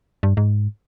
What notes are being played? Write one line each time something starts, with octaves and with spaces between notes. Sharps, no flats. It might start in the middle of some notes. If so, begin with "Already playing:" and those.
G2
G#2